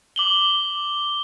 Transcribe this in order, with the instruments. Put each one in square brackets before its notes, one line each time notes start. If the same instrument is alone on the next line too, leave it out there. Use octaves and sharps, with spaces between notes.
[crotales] D6 F#7 G7